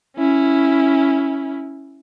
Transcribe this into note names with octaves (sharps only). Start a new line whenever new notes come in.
C#4 E4